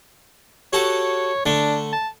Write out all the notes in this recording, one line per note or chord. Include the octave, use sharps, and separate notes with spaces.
F#4 G4 A4 C#5
D3 A3 D4
A5